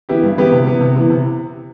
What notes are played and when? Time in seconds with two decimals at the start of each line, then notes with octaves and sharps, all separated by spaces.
0.09 E3 B3 E4 G4
0.23 G2
0.38 E3 B3 E4 G4
0.52 C3
0.66 E3 B3 E4
0.80 C3
0.95 E3 B3 E4
1.10 C3